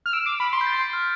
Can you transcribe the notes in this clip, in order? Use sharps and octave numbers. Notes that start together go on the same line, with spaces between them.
F6
E6 D7
D6 C7
B5 D7
C6 B6
G6
A6
G6
F6